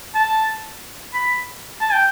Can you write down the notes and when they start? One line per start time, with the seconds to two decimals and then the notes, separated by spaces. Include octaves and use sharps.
0.15 A5
1.14 B5
1.81 A5
1.93 G5